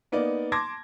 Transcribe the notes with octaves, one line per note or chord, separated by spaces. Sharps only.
A#3 B3 D#4 D5
A5 C6 D6 G#6 A#6